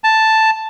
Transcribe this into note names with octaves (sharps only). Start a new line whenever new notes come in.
A5